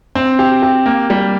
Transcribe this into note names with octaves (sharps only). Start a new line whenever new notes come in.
C4
G4
G4
A#3
G3